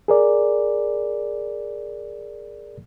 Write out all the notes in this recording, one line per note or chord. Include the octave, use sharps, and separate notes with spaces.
G#4 A#4 D5